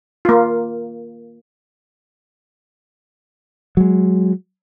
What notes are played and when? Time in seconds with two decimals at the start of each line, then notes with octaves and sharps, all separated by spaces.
0.25 A#3 F4
3.77 F#3 G#3